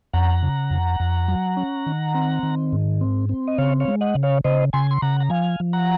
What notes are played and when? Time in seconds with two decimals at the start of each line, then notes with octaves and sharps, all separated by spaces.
0.13 F2 F#5 A#5
0.43 C#3
0.71 F2
1.00 F2
1.28 F#3
1.57 C#4
1.86 D#3
2.15 C4
2.43 D#3
2.72 G#2
3.01 C4
3.29 C4
3.47 D#5
3.58 C#3 C#5 F5
3.80 C#5 F5
3.88 G#3
4.01 D#5 F#5
4.15 C#3
4.23 C#5 F5
4.44 C#3 C5 D#5
4.73 C#3 G#5 C6
4.91 C6
5.02 C#3 F#5 A#5
5.20 A#5
5.30 F3 F5 G#5
5.60 F3
5.73 F#5 A#5